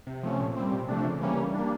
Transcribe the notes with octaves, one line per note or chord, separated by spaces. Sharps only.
C3
F3 A3 C#4
A#2
G3 C4
C3
F3 A3 D4
C#3
E3 G3 A#3 C#4
G3
A#3 D4